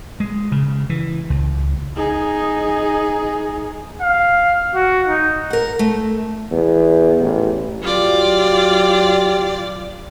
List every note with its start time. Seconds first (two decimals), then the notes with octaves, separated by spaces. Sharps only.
0.20 G#3
0.52 C#3
0.90 E3
1.30 C#2
1.96 D#4 G#4
4.01 F5
4.75 F#4
5.08 D#4
5.50 A#4 F#5
5.79 A3
6.51 E2
7.21 A1
7.82 F#3 F4 G4 D5